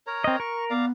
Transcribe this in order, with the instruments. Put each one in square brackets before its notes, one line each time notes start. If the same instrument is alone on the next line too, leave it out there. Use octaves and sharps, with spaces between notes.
[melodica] A#4 C#5 A#5
[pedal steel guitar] C4 D#5
[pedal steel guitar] A#4 [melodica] C#6
[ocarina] B3 [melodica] D5 F5 A#5